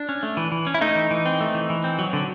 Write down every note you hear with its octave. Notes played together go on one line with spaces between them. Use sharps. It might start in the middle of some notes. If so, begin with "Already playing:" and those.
Already playing: D4
C#4
A3
E3
E3
C#4
E4
A3 D#4
E3
E3
C4
A3
E3
E3
C4
F#3
D3